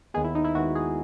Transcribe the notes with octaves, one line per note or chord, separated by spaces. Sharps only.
D#2 D#3 G#3 B3 G#4
E4
D#4
E4
D#2 D#3 G#3 B3 F#4
G#4